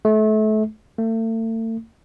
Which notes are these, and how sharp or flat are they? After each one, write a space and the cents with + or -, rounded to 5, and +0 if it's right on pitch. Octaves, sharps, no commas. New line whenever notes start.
A3 -30
A3 +40